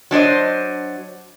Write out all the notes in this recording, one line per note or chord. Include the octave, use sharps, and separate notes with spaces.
F#3 D4 C5 D#5